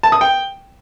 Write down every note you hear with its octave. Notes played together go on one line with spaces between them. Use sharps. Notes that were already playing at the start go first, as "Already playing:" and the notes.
A5
D#6
G5